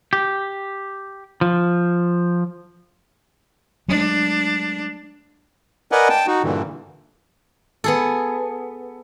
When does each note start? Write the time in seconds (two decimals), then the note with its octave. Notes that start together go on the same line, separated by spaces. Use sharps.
0.13 G4
1.41 F3
3.88 F#3 G#3 A3 D4
5.92 A#4 B4 D5 D#5 F#5 G#5
6.09 G5 A5
6.27 D#4 F#4
6.43 G2 A#2 D3 E3
7.84 B3 G#4 A4